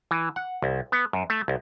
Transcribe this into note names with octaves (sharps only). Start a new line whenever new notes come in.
E3
F#5
C2
B3
F#2
A3
C2